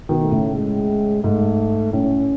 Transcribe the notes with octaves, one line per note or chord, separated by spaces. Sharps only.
B2 D#3
A3
A2 C#3
G#3
G#2 A3
A2 C#4